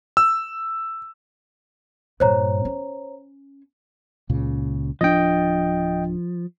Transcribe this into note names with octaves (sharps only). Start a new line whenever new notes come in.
E6
G2 A#2 C5 C#5 A#5
C#4
C#2 A#2 C#3
D1 F3 C4 D4 D#5 G5